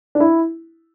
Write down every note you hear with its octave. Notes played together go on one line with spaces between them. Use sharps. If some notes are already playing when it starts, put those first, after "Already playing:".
D4
E4